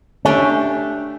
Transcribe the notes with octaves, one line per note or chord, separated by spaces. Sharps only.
A3 C#4 D4 G4